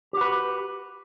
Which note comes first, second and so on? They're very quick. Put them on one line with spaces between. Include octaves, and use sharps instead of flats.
G4 F#4 B4